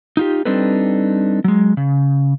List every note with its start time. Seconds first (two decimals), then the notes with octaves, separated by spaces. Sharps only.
0.17 D#4 F4 G4
0.45 G3 C4 D4 D#4 A4 B4
1.44 F#3 G#3
1.77 C#3